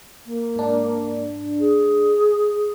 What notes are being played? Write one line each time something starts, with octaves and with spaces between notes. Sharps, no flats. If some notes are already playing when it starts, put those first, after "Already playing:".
A#3
G#2 D4
G#4